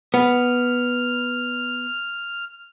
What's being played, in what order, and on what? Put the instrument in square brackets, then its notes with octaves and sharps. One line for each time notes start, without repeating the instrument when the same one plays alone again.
[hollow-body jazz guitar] B3 [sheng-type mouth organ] F6